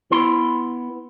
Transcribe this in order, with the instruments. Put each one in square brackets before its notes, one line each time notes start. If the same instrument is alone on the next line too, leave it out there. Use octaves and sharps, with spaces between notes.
[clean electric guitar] B3 E4 C6